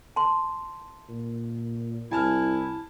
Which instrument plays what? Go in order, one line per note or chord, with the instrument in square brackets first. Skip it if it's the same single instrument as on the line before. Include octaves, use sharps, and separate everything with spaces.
[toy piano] A5 C6
[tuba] A#2
[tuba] C2 [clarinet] E4 [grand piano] G#5 A5 F6